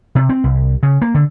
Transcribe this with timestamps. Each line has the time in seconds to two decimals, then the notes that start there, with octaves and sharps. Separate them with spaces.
0.15 C3
0.29 C4
0.44 C2
0.83 C#3
1.02 A#3
1.15 D3